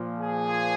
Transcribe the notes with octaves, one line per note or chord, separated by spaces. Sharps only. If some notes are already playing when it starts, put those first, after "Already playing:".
Already playing: A#2 F3
G#4